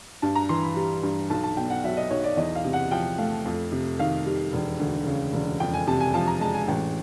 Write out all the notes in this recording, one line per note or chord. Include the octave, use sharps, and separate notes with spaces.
G2 A5
A#5
E3 C6
B5
G3
G2
B1 A5
A5
B2 G5
F#5
F#3 E5
D#5
B1 C#5
D5
E2 D#5
F5
C3
F#5
F3 G5
A3 F5
F2
C3
D#3 F5
G3
E1
D2
C#3
E1
F2 G5
G#5
C3 A5
G#5
F3 A5
A#5
G#3 A5
G#5
A1 G5